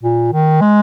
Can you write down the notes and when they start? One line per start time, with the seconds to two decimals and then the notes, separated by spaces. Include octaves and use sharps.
0.03 A#2
0.33 D#3
0.61 G#3